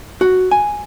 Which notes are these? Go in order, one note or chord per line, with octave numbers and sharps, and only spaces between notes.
F#4
G#5